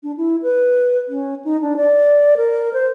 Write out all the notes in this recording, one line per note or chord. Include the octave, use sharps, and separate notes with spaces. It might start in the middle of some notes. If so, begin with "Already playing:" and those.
D4
E4
B4
C#4
D#4
D4
D5
A#4
C5